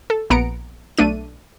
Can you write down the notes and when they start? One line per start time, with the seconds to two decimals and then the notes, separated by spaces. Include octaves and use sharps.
0.10 A4
0.30 A#1 B3 A#5 C#7 D7
0.98 B1 A3 D4 D#7